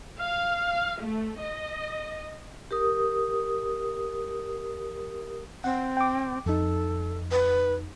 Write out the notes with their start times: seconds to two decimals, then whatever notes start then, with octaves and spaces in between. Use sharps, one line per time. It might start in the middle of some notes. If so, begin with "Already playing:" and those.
0.19 F5
1.01 A3
1.40 D#5
2.71 G4 A#4 D#6
5.64 C4 F#5
5.97 G5 D6
6.46 F2 D#4 A4
7.32 B4